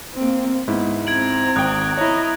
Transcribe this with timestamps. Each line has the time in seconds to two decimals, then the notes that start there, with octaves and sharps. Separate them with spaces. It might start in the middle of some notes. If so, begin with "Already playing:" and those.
0.15 A#3 C4
0.68 G#2 B3 E4
1.07 C4 A#5 G#6 D7 F#7
1.56 G#1 G5 D#6 F#6
1.97 E4 C#5 D#5 A#5